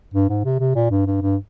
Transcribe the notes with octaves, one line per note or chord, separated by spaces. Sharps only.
G2
G#2
C3
C3
A#2
G2
G2
G2